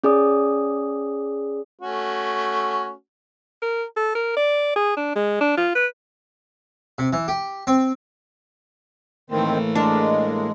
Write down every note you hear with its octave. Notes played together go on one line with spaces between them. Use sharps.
C#4 G#4 D5 D#6
A3 C#4 F#4
A#4
A4
A#4
D5
G#4
D4
G#3
D4
F4
B4
C3
E3
G4
C4
A2 D#3 E3 A3 A#3 C4
G#3 D4 A#4